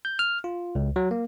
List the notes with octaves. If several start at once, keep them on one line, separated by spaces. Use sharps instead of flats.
G6
F6
F4
C#2
F#3
A#3